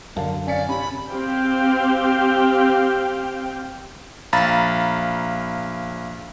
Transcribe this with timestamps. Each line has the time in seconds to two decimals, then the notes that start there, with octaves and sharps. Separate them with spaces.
0.17 F#2 D3 A#4 F5 A5
0.47 C#4 D5 F5 G#5 B6 C#7
0.69 C3 C#4 B5
1.10 C4 G4 F5 G5
4.33 A#1 F5 A#5 B5 A6